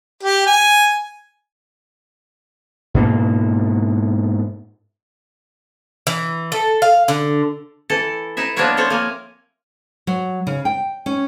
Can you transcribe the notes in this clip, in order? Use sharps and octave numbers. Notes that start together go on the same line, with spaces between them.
G4
G#5
G#2 B2 A#3
E3
A4
F5
D3
E3 E4 A4
D#4 E4 E5
F3 A#3 B3 D4 E4 C#5
C4 A4 C#5
A#3 G#5
F#3
C#3
G5
C#4